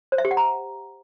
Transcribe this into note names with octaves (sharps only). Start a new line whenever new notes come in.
C5
E5
G4
F#5
A#5